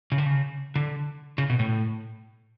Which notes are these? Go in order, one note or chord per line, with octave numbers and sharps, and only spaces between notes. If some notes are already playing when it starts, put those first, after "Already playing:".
C#3
D3
C#3
D3
C#3
B2
A2